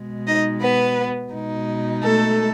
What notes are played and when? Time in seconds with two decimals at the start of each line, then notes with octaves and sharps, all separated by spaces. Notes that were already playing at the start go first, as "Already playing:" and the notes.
Already playing: B2 G#3
0.27 D#4 D#5
0.61 B3 B4
1.32 B2 G#3 D#4
2.03 A3 A4